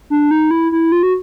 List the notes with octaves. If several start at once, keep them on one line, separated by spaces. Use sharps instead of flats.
D4
D#4
E4
E4
F4
F#4